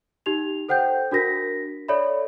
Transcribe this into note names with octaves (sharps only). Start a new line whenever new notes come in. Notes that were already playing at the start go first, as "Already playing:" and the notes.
D#4 G4 F7
A4 C5 F#5 G5 G6
D4 F#4 A#4 A#6 B6
A4 C#5 D5 E5 B5